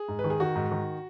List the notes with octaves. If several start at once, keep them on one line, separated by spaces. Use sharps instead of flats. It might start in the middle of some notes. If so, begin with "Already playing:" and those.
Already playing: G#4
G#2
B4
D#3
G#4
D#3 F#4
G#2
D#3